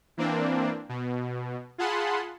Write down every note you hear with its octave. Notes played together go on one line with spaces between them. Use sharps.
E3 A#3 C4 D4
B2
F4 G#4 F#5 A5 B5 C6